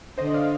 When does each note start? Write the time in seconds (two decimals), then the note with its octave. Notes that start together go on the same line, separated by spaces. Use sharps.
0.18 D3 C5 D#5
0.34 D5 F5